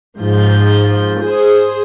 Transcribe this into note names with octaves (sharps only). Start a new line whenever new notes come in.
G#2 F3 G6
G#4 C5